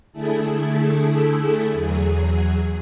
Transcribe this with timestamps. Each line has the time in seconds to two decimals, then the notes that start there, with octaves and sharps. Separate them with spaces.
0.12 D3 A3 E4 G#4 A4
1.73 E2 F#3 G#4